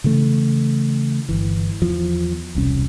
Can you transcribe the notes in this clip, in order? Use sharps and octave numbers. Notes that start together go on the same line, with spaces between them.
C#3 E3 A3
G1 E3
E2 F3
E1 C2 C#4